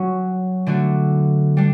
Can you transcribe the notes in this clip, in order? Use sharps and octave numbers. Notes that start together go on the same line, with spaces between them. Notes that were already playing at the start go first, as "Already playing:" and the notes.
Already playing: F#3 C#4 F#4
D3 A3 D4 F#4
G3 D4